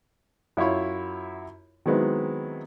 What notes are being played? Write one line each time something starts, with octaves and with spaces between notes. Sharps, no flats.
F#2 E4 F4 C#5 B5
D#3 F#3 G#3 B3 C4 E4